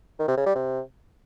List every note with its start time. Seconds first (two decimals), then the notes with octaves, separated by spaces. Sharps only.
0.19 D#3
0.28 C3
0.37 C#3
0.46 G3
0.55 C3